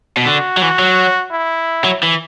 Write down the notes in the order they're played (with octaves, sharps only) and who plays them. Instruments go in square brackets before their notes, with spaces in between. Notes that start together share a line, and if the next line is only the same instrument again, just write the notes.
[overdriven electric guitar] B2
[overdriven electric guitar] D3 [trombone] F#4
[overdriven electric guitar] F#3
[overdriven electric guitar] E3 [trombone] F#4
[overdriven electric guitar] F#3
[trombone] E4
[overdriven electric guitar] F#3
E3